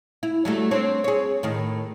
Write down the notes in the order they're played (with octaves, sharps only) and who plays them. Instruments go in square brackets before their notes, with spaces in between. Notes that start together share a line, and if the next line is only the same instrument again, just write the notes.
[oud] E4
F#3 G3 A3
C4 D4 C#5
G#4 C#5
A2 D#3